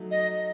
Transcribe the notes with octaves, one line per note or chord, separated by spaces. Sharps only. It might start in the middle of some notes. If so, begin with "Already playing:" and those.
Already playing: F#3 A3 D#4
D#5